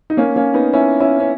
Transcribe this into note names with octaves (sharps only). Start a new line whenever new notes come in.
D#4
A#3 C#4
A#3 C#4
B3 D#4
C#4 E4
C#4 E4
C#4